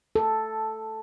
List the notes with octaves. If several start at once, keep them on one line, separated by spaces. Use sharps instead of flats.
A4